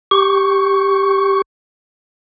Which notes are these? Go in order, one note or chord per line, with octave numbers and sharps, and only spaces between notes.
G4 C#6